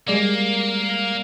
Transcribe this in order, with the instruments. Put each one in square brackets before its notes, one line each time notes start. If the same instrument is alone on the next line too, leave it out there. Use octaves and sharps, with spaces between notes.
[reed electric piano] G3 G#3 D5 [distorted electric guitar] A#3